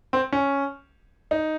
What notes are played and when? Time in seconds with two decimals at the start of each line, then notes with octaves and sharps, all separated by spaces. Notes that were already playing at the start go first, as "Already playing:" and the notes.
0.13 C4
0.33 C#4
1.31 D#4